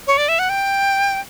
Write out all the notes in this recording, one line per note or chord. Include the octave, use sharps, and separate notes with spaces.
C#5
D5
E5
F#5
G5